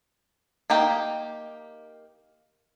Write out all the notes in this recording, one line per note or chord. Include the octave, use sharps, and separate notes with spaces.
A#3 D#4 G4